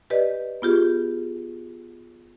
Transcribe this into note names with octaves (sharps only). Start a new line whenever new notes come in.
G4 B4 D5 D#5
B3 F4 G4 G#4